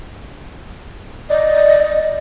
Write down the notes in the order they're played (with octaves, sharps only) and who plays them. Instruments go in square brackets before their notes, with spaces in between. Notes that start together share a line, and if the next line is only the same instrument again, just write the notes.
[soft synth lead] D5 [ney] D#5